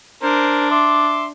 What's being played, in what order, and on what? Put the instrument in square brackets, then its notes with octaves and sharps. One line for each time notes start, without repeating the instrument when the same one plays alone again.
[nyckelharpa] D4 [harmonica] A#4 C5
[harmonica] E5 C6 D6